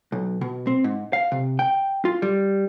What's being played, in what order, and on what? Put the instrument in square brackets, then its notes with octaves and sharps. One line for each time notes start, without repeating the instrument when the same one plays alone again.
[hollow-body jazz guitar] B1
B2
C4
G#2
F5
C3
G5
F4
G3